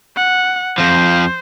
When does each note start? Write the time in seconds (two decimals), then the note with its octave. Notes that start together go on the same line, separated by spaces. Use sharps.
0.16 F#5
0.78 F2 F3 C5